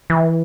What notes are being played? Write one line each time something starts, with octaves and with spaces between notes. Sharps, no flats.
E3